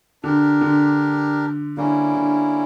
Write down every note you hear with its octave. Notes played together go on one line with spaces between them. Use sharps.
D3 D4 G4 A#4
D3
D3 G3 A#3 C#4 E4
D3